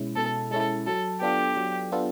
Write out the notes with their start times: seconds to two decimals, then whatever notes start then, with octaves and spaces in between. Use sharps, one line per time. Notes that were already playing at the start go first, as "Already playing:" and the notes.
Already playing: B2 G#3 C#4 E4
0.16 B2 A4
0.51 G#3 C#4 E4 A4
0.86 F#3 A4
1.21 B3 D4 F4 G4 A4
1.57 F#3
1.92 B3 D4 F4 A4